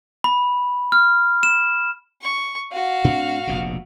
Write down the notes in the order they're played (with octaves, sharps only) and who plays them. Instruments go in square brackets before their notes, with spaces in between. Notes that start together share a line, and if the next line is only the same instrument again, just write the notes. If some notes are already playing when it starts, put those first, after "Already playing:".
[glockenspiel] B5
F6
E7
[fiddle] C#6
F#4 F5
[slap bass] A2 C4 D4
F1 A#1 B2